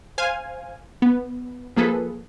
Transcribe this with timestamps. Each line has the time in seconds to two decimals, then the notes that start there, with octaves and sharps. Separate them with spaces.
0.18 C5 F5 G#5
1.02 B3
1.76 F3 A#3 G#4 A4 B4